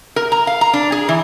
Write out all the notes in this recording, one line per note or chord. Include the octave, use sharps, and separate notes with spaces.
A#4
A#5
F5
A#5
D4
G#4
E3